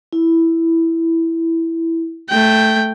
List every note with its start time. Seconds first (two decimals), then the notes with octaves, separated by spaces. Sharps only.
0.13 E4
2.29 A3 G5